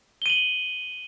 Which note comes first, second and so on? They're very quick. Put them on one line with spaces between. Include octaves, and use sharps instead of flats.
G7 D#7 F#7